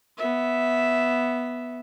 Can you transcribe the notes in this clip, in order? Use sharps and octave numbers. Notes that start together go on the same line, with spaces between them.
B3 E5